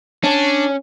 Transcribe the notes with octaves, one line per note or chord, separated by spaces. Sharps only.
C#4 D4